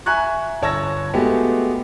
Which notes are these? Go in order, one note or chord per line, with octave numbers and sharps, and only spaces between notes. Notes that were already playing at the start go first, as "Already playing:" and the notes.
E5 G#5 A#5 C#6 F#6 G#6
G1 C#5 A5 E6 G#6 A#6
G#3 A3 B3 F#4 G4